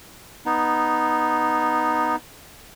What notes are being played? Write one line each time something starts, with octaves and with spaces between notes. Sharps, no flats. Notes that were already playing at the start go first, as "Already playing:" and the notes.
B3 D#4